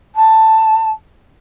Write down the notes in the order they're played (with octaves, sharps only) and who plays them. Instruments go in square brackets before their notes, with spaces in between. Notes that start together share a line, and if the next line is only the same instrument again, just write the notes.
[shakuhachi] A5